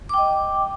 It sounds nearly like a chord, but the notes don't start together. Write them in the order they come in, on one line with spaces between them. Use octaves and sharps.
D6 G5 D#5